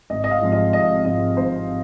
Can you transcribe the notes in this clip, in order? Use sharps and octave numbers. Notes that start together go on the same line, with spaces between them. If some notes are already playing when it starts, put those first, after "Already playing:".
G#1 D#5
D#5
F5
G#2 F3 G#3 C4
D#5
G#1 D#5
G#2 F3 G#3 C4 D#5
G#1 C5